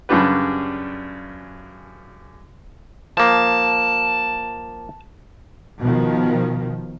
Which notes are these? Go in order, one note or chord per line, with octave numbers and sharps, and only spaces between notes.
F#2 C#3 G3 D4 G4 B4
F3 A#3 A5
B2 D#3 F3